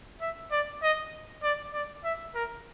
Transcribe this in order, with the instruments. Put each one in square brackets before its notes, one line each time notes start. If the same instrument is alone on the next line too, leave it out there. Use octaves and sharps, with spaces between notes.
[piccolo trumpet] E5
D5
D#5
D5
D5
E5
A#4